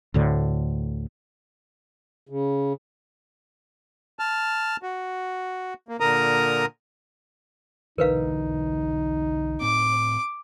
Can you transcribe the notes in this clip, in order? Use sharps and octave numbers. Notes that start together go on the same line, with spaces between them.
D2 A2 D3
C#3
A5 F6
F#4
A#3
A#2 D3 A#4 A#5 D#6
B1 D3 E3 D#4 A#4 B4 F5
A2 C4 D6